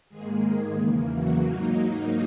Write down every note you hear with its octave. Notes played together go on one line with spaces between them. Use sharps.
G#2 D#3 G#3 A#3 G#4
E2 C#3 E3 A#3
F#3 F#4
G#2 F#3 A#3 D#4